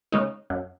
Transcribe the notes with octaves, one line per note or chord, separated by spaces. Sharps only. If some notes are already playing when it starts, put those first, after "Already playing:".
C#3 G#3 D#4
F#2